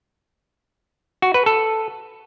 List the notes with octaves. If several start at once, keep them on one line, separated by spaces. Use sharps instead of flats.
F#4
B4
A4